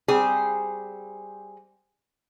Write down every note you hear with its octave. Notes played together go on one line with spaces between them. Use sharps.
G3 C4 G#4